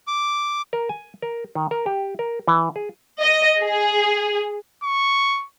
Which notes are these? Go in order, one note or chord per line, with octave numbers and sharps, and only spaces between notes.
D6
A#4
G#5
A#4
D#3
A#4
G4
A#4
E3
G#4
D#5
G#4
C#6